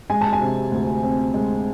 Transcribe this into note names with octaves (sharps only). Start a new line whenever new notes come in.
G#3 G#5
A5
G#5
C3
D2
C4
G#3